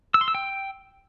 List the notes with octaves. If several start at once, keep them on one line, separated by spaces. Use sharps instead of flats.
E6
C6
E6
G5